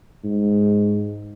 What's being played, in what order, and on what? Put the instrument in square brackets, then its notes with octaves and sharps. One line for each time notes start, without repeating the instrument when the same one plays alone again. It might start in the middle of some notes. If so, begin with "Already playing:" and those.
[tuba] G#2